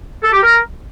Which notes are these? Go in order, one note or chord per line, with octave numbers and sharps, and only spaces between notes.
A4
G4
A#4